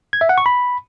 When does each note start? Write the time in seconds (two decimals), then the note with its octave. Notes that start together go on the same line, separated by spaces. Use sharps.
0.13 G#6
0.21 E5
0.29 F#5
0.38 C#6
0.46 B5